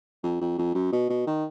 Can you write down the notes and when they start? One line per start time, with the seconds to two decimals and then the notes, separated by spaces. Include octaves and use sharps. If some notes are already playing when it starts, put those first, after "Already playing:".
0.23 F2
0.41 F2
0.58 F2
0.75 F#2
0.92 B2
1.10 B2
1.27 D#3